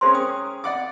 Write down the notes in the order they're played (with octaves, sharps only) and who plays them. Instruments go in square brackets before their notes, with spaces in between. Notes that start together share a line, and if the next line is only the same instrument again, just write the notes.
[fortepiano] C#4 G#4 A#4 [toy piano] C5 C6
[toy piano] G5 D#6
[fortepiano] D5 F#5 D6